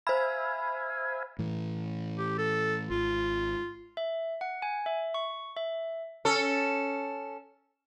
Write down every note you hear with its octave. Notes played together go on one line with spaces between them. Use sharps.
C5 E5 F5 G#5 B5
A2 E3
G4
A4
G#1 F4
E5
F#5
G#5
E5
C#6
E5
C#4 A4